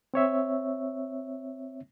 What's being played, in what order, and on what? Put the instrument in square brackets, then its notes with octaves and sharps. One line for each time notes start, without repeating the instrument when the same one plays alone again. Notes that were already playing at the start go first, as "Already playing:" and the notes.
[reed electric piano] C4 C#5 E5